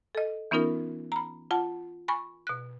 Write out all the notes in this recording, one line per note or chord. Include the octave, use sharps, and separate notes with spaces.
A4 D#5
E3 B3 C#4 D#4 F4 A#4
A#5 B5
F4 F#5 A5
G#5 B5 C#6
B2 F#6